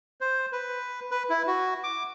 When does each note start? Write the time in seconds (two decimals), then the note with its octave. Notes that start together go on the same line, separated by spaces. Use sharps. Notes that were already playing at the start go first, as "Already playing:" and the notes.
0.21 C5
0.52 B4
1.11 B4
1.30 E4
1.48 F#4
1.84 D6